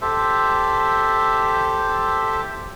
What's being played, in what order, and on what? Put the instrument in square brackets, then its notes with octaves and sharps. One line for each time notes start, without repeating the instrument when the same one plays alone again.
[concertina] G4 A4 C5 E5